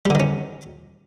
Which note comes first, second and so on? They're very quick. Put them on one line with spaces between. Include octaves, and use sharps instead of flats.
G3 D3 D#3 C#4